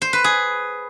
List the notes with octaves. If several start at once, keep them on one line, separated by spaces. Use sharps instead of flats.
C5
B4
G#4